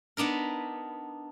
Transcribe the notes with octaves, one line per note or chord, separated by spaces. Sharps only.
B3 D4 D#4 A#4